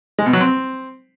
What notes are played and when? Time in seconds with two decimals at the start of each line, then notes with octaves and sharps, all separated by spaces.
0.19 G#3
0.26 B2
0.33 F#3
0.41 C4